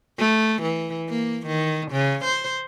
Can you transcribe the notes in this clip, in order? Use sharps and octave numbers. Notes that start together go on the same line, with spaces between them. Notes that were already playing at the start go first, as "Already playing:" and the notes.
A3
E3
A#3
D#3
C#3
C5